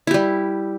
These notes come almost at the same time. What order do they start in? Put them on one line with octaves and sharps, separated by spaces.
E4 G4 G3